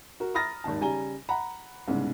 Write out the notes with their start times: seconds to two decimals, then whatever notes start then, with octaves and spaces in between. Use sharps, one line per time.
0.20 F#4 A#4
0.34 A#5 B5 D#6 F6 A6 A#6
0.64 G#1 D#2 D#3 A5
0.81 C#3 G3 G#5 A#5 G7
1.29 F#5 A#5 B5
1.88 C2 G#2 C#3 G#3 B3